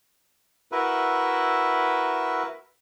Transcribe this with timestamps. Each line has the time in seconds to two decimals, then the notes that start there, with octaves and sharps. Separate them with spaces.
0.72 E4 F#4 A#4 B4 E5